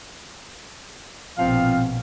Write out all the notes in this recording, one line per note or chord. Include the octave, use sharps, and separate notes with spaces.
A#1 B2 F3 C4 F5